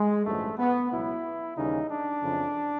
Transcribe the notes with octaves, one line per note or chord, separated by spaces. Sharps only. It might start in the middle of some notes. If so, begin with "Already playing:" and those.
Already playing: G#3
A1 G2 D3 F3 A3
B3
C#2 B2 F#3 E4
D#2 C#3 E3 G3 D#4
D4
F2 C#3 E3